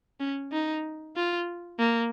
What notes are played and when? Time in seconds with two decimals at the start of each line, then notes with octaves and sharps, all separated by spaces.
0.20 C#4
0.52 D#4
1.17 F4
1.79 A#3